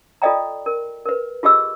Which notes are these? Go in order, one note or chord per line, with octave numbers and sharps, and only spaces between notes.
F4 A4 D5 D#5 G5 A#5
A#4
A#4 B4
F4 G4 G#4 D#5 E6